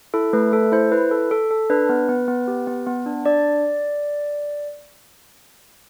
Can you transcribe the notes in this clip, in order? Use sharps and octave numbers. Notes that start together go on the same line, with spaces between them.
E4 A4
A3 B4
A3 A4
E4 C5
E4 B4
A4
A4
A4
D4 B4
B3
B3
B3
G4
B3
B3
D4
D4 D5